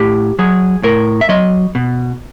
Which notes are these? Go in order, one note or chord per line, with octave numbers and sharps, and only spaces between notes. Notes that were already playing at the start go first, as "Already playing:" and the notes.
Already playing: A2 G4
F#3 G#4
A2 A#4
E5
F#3 D#5
B2